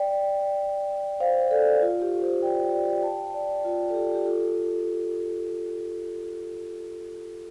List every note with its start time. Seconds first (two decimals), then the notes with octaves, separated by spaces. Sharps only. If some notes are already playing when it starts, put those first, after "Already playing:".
Already playing: D5 G5
1.20 C5 F5
1.51 A4 D5
1.81 F4
2.02 G4
2.22 G4 C5
2.42 D5 G5
2.73 D5 G5
2.96 G5
3.03 F5 A5
3.34 D5 G5
3.65 F4
3.90 A4
3.95 G4
4.14 G4
4.25 F4 A4